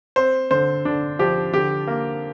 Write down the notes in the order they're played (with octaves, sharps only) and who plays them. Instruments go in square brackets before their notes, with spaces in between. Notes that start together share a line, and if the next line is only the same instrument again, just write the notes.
[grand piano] C4 C5
D3 C5
D3 D4
F3 G4
D3 G4
A#3